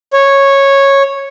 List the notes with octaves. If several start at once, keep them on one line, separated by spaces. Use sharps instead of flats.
C#5